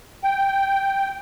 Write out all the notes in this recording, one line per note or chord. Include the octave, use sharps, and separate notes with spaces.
G5